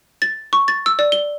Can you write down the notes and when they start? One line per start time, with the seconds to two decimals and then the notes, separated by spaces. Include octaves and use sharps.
0.22 A6
0.53 C#6
0.68 A6
0.86 E6
0.99 D5
1.12 G7